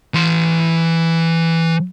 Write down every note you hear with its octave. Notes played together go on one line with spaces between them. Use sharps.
E3 C6